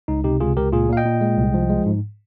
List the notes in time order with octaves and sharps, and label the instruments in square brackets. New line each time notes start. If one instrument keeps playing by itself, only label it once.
[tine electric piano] C#2 D#4
C3 D#4 G4
C#2 F4 G#4
C#2 G4 A#4
A#2 F4 G#4
A#2 F5
D#5 G5
A#2
G#3
C2
F3
G#3
G#2